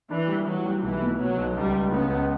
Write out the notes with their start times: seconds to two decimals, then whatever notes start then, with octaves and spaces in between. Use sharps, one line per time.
0.10 E3 D4
0.28 G3
0.47 E3 F#3
0.65 G3
0.83 B1 E3
1.02 B2
1.19 B2 F#3
1.37 B1
1.56 C#2 G3
1.74 C#2
1.92 C#3 B3
2.10 C#2